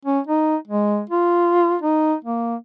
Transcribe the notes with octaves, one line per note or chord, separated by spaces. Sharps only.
C#4
D#4
G#3
F4
D#4
A#3